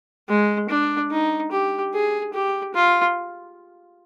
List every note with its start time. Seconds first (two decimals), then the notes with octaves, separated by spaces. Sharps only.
0.29 G#3
0.70 D4
1.11 D#4
1.52 G4
1.94 G#4
2.33 G4
2.74 F4